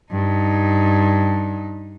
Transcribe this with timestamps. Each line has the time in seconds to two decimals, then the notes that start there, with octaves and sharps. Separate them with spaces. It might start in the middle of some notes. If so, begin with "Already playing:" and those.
0.11 G2 D#4